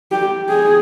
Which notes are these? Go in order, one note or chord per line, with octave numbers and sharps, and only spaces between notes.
G4
G#4